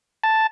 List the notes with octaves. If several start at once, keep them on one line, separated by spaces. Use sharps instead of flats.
A5